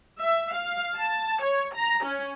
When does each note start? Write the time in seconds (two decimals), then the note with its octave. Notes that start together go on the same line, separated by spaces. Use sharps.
0.20 E5
0.54 F5
0.96 A5
1.42 C#5
1.74 A#5
2.04 C#4